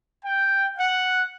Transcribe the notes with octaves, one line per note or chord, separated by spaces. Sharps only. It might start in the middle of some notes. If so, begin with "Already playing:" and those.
G5
F#5